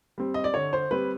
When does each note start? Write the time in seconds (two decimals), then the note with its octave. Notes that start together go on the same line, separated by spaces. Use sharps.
0.18 G3 C4
0.34 D#5
0.44 D5
0.54 D3 C#5
0.73 C5
0.91 G3 C4 B4